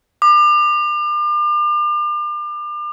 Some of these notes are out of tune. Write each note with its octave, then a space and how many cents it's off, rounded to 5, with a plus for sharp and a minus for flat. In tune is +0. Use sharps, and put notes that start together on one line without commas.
D6 +35